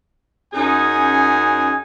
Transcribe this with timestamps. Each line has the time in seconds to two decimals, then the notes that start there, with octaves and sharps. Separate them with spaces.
0.54 F#2 C#4 D#4 G#4 G#5